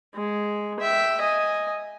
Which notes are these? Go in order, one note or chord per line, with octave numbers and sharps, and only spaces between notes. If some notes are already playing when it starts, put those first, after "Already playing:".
G#3
E5 G5
D#5 G#5